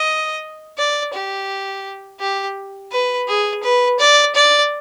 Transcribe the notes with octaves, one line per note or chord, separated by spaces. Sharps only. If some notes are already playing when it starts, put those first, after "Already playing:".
Already playing: D#5
D5
G4
G4
B4
G#4
B4
D5
D5